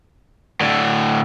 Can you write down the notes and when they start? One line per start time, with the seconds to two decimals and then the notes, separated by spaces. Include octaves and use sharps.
0.61 A2 D3